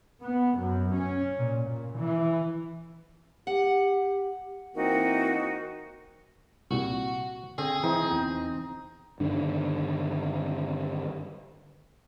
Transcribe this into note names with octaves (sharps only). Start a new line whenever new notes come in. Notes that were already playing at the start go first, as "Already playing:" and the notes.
B3
F#2
C#4
A#2
A#2
E3
G4 F#5
E3 A#3 C4 D#4 F#4 A#4
C2 A#2 F#4
D3 C4 G#4
E3 C4 D#4
E2 G5
G2 D3 D#3 D4